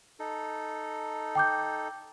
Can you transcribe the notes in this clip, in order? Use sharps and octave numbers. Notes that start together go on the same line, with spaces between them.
D#4 A4
G5 D6 G6